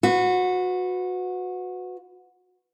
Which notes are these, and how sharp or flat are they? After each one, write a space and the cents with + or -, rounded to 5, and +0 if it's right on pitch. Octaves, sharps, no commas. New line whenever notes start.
F#4 -20 B4 +20